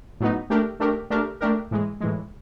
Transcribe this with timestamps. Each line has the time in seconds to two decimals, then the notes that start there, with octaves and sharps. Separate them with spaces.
0.20 A2 F#3 B3 D#4
0.50 A3 D4 G4 A#4
0.80 A3 D4 G4 A#4
1.10 A3 D4 G4 A#4
1.41 A3 D4 G4 A#4
1.71 A2 E3 G#3
2.01 A2 E3 G#3